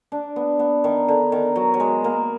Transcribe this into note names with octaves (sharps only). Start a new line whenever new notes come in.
D4
B3
B3
D#3
D3
D#3
F#3
F#3
G#3
A#3